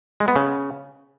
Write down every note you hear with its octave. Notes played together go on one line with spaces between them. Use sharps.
G#3
B3
C#3